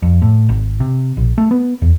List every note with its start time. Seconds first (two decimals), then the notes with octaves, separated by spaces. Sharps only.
0.02 F2
0.22 A2
0.49 G#1
0.80 C3
1.17 A#1
1.38 A3
1.51 B3
1.82 E2